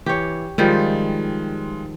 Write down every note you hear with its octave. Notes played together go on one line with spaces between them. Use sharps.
E3 G4 C#5
D#3 F3 G3 G#3 F4